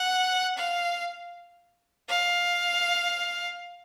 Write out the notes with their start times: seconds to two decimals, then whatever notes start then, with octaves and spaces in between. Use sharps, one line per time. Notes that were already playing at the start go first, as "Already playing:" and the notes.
Already playing: F#5
0.57 F5
2.09 F5